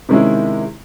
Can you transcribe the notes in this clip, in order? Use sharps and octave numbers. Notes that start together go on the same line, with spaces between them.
C3 D#3 G#3 C#4 E4